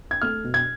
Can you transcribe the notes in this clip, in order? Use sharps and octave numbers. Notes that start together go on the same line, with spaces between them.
G#6
A3 F6
B2
G#6